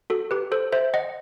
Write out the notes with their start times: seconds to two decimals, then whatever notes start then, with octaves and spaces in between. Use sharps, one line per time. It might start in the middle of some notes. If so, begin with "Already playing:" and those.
0.10 F#4 A4
0.31 G4 B4
0.52 A4 C5
0.72 C5 E5
0.94 D#5 F#5